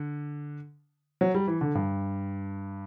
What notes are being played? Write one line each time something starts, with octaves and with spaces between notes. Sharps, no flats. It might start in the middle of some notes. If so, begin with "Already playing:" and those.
Already playing: D3
F#3
G3
E3
D3
G2